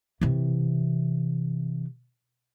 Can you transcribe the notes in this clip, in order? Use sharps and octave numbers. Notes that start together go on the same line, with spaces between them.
C3 E3